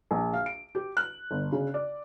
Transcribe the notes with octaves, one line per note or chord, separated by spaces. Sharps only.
A#1
F5
D7
G4
F#6
G1
C#3
D5